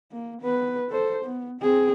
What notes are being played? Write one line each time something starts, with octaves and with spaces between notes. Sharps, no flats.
A#3
B3 B4
A4 C5
B3
C4 G#4